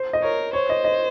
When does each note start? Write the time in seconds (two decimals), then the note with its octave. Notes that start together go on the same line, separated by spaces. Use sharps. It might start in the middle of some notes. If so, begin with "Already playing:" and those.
Already playing: C5
0.13 D#5
0.22 A#4 C#5
0.53 C5 C#5
0.70 D#5
0.84 D#5